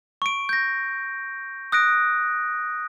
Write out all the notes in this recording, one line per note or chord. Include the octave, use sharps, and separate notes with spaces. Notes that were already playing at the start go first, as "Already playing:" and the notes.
C#6 D7
G6 A#6
D#6 F#6 A#6 D7